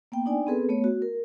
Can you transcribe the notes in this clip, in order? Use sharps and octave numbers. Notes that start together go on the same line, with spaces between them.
A#3 B3 G5
D4 D#4 D5 G5 G#5
B3 C4 G#4 A4 B4
A3 B3 C#5
F#4
A#4